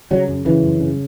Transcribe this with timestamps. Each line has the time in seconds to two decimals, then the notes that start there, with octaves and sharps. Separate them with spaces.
0.11 C#3 F#3
0.28 F#2
0.45 C#3 E3
0.63 F#2
0.80 C#3